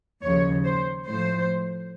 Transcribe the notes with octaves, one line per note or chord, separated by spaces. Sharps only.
D#2 C#3 F3 C#5
C5
A2 F3 C5